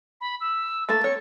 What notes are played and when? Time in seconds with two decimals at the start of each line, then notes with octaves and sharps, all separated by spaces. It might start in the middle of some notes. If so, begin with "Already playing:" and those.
0.21 B5
0.41 E6
0.89 A3 A#3 A4 A6
1.04 C4 C#5 C#7